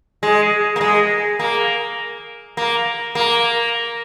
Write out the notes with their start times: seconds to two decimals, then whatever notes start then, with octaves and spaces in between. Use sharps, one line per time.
0.23 G#3
0.76 A#3
0.81 G#3
1.39 A#3
2.57 A#3
3.15 A#3